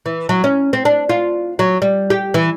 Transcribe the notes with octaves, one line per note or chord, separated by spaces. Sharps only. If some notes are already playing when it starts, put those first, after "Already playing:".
E3
F#3
C#4
C4
D4
F4
F#3
G3
G4
E3